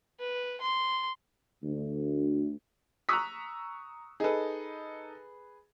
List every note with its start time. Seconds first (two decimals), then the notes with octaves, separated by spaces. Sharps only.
0.20 B4
0.61 C6
1.63 D2
3.09 A#5 C#6 D#6 E6 F#6 B6
4.20 D#4 G#4 A4 B4